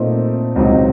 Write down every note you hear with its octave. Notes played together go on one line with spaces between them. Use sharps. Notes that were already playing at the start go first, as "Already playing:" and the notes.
Already playing: A#2 A3 C4 D#4
C#2 C3 F#3 C4 D#4